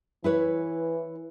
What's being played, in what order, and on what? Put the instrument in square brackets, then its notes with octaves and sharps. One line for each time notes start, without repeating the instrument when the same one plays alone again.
[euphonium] E3 [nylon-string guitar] E4 B4 C#5